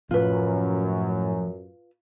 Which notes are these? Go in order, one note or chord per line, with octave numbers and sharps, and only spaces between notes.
F#2 A2 F3 A3 F4 B4